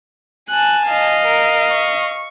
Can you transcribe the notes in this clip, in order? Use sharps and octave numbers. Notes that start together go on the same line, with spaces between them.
G#5 A5 F#6
D#5 F5
A#4
C#6